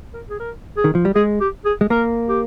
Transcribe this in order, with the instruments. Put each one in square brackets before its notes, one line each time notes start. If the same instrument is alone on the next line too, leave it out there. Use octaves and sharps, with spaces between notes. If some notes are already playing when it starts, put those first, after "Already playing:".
[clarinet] A#4
G#4
A#4
G#4
[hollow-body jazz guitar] D#3
F3
G3
[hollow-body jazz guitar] G#3 [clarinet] G#4
[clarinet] G4
G#4
[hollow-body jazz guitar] G#3
[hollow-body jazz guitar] A#3 [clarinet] A#4
[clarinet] G4